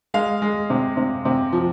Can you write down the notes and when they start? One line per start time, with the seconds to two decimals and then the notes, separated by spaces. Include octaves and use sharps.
0.14 G#3 F5
0.42 G#3
0.70 C3
0.97 C3
1.25 C3
1.53 F3